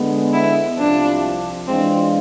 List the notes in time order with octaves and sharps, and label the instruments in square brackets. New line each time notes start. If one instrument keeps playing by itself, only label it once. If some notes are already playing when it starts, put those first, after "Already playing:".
Already playing: [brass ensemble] D3 G#3 B3
[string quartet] E4
[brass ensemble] C2 C3 F3 [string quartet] D4
[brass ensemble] E3 G#3 D4 F4 [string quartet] C4